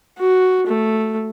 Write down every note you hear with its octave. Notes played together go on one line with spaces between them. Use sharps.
F#4
A3